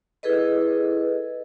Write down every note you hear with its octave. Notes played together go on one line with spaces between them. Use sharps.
E4 G#4 A4 B4 D#5